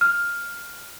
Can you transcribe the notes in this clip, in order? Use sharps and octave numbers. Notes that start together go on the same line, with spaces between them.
F6